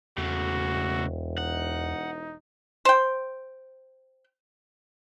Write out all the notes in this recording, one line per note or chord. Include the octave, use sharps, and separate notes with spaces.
E1 E2 C#3 A3 F#4
D#4 F#5
C5 G5